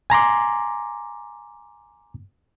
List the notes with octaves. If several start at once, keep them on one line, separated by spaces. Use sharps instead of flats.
G#5 A#5 C6 D6